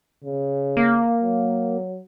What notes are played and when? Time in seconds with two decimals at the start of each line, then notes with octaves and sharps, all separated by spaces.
0.24 C#3
0.77 A#3
1.22 F#3